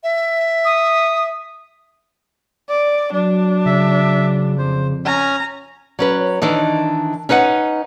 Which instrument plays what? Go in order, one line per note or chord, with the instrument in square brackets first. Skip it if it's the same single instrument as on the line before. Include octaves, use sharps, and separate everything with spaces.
[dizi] E5
[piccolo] D#6
[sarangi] D5
[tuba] F#3 [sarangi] D4
[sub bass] C#3 [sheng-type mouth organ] E5
[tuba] F2 [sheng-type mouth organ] C5
[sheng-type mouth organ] C#4 G#5 [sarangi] A#5
[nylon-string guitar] F#3 C#4 B4
D#3 E3 D4 D#4
C#4 D#4 B4 D#5 F#5